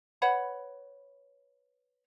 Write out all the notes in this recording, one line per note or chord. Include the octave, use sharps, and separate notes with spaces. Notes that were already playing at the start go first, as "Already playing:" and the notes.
B4 C#5 F#5 B5